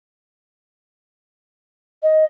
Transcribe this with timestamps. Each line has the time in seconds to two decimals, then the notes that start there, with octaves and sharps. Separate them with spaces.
2.03 D#5